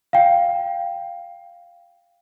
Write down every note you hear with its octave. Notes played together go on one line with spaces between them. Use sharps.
F5 G5